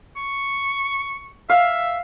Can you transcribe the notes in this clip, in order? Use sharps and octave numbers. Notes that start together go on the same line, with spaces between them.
C#6
E5 F5